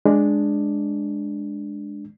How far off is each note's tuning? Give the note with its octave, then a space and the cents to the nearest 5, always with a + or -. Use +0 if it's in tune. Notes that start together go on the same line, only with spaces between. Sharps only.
G#3 +0 D4 +0